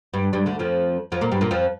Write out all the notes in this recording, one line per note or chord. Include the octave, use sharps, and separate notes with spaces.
G2 G3
G2 G3
D2 D3
F2 F3
F2 F3
A#2 A#3
G2 G3
A#2 A#3
F2 F3